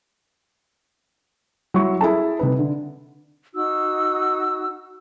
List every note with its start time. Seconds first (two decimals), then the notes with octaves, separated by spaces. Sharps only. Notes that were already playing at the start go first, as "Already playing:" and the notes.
1.74 F#3 E4 C#6
2.01 E4 G#4 A4 A5
2.39 C3 D#4 B4
2.59 D3
3.54 D#4 F#4 E6